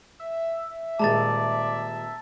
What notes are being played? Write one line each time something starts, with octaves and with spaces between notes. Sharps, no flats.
E5
D#1 G#3 D5 A5 A#5 A6